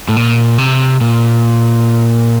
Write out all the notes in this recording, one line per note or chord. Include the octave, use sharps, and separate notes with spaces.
A2
A#2
C3
A#2